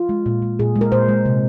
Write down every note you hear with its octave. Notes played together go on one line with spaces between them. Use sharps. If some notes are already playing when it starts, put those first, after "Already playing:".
Already playing: F4
G#3
A#2
G#3
A#2 G#4
G#3
A#4
A#2 C5
G#3
C3